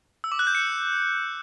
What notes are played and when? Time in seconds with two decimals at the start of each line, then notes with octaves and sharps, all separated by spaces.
0.24 E6
0.32 D6
0.39 F#6
0.47 G6
0.55 C#7